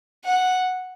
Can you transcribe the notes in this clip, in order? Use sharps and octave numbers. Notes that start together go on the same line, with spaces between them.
F#5